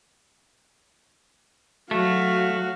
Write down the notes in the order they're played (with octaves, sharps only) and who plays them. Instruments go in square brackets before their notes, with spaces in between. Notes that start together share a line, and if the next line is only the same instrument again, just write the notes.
[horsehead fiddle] F#3 [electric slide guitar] A3 [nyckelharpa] F#4 F5